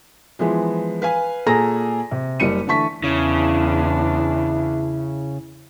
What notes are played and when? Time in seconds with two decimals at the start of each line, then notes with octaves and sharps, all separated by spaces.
0.39 E3 F3 G#3 B3
1.02 B4 F5 G#5
1.46 A#2 G#4 A4 A#5 A#6
2.11 C3
2.40 F#1 G3 C#7 D#7
2.67 D3 E3 A3 A5 C#6 B6
3.04 E2 C#3 D4 E4